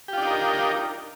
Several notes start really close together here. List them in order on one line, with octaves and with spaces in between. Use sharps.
G4 F4 D4 D#4 A#4